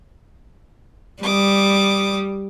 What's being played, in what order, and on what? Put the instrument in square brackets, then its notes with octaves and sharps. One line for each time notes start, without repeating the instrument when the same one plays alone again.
[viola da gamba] G3 [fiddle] D6 D#6